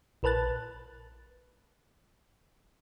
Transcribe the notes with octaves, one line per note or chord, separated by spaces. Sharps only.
A#1 A#4 B4 A5 F#6 A6